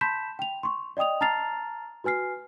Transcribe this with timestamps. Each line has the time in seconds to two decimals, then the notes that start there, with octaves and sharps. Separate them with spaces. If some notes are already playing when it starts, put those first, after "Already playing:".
0.01 A5 B5 C6 G6 B6 E7
0.39 G5 F7
0.63 C6 C#6
0.97 D5 D#5 G5 D#6 F7
1.21 A5 A#5 F6 A6 C7 F7
2.04 F#4 B4 G#5 F6 C7